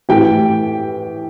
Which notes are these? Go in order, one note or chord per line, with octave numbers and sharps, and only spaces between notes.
A2 E3 G4 G5